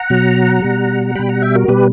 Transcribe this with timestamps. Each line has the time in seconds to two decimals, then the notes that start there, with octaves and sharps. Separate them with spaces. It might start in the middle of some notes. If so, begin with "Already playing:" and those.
Already playing: F#5 A#5
0.10 B2 F#3
0.62 B2 G3
1.15 B2 G3 G5 B5
1.29 F#5 A#5
1.42 E5 G5
1.55 F#4 A#4
1.68 B2 G3 G4 B4